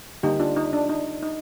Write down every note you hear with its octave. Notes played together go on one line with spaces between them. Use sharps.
D3 G3 A#3 D#4 G4
D4 F4
D#4
D4
D#4
D#4